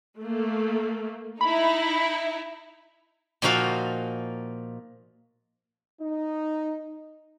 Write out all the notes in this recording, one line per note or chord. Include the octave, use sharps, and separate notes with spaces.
A3 A#3
D#4 E4 B5
A#2 F3 D#4 F#4 F5 A5
D#4